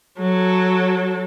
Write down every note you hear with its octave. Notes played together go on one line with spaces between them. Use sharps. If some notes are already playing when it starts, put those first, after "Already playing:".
F#3 A4